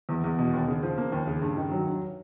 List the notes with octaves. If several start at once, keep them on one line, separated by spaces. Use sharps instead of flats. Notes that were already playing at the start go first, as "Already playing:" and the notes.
E2
E2
B2
D#2
C#3
F3
A#3
D#2
C#3
G2
D#3
F#3
G2